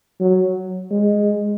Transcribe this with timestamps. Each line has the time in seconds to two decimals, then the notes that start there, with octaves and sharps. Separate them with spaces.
0.20 F#3
0.91 G#3